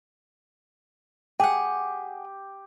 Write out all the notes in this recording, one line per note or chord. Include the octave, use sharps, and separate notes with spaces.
G4 G#4 F#5 G5